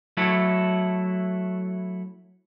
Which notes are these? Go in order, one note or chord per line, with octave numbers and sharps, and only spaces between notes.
F#3 A3 E4 A4